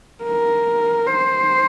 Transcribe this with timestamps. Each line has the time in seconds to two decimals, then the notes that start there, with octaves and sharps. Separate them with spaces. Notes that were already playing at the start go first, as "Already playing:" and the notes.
0.24 A#4
1.07 C5